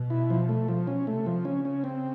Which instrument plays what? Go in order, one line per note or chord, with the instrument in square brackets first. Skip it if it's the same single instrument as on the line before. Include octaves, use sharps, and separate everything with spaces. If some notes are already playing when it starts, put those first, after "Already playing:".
Already playing: [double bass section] B2
[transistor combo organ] E4
F3
A3
F3
C#4
[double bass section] C3 [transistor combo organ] A3
[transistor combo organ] F3
[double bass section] C#3 [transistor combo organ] C#4
[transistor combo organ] C#4
C4